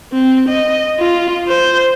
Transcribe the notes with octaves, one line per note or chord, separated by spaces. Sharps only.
C4
D#5
F4
C5